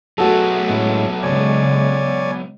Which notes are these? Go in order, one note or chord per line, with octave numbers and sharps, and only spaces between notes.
F#3 A3 B3 F#4 G#4 A4
A2 G#3 C#4
C#3 G#3 C#5 D5 G#5